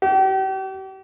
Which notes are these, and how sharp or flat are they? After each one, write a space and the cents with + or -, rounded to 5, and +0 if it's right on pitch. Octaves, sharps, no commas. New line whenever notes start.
G4 -40